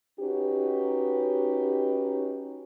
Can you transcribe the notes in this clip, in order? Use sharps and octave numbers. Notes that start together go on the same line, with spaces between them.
C#4 D#4 F#4 G4 B4